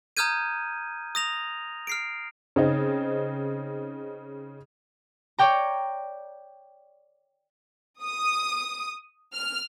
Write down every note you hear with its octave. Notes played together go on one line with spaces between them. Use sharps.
A#5 D#6 F6 G6 G#6 D#7
D#6 A#6 F7
F6 C7 D7
C#3 C4 D#4
C#5 D5 G5 A#5
D#6
F6